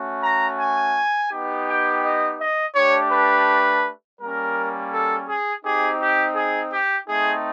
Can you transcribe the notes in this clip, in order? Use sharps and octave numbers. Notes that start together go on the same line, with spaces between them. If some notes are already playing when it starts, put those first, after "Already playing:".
Already playing: A3 C#4 F#4
A#5
G#5
B3 D#4 G4
G5
D#5
D#5
A3 D4 G4 C#5
B4
G3 A#3 C#4 A#4
A4
G#4
C4 D#4 G4 G#4
G4
G#4
G4
A3 C4 D#4 G#4